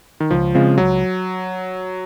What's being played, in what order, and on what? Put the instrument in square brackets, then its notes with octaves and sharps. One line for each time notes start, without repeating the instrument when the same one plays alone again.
[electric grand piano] D#3
[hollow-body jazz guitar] C#2 [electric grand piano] F3
[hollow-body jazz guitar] C#3 G#3 C4 F4
[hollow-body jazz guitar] C#2 [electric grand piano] F#3